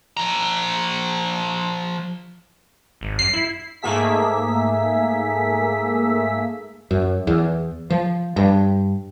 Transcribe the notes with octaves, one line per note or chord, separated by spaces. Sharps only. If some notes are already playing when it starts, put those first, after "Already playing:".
F3 A#5
G#1
F#2 C7
E4
G#2 A3 A#3 G#4 E5 B6
F#2
E2
F3
G2